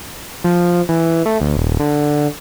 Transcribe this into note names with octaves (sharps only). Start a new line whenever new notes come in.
F3
E3
A3
D2
D#1
D3